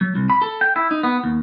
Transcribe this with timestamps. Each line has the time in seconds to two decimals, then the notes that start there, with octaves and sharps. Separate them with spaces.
0.01 F#3
0.15 C2
0.30 B5
0.42 A4
0.61 G5
0.76 E4
0.91 D#4
1.03 B3
1.24 D#2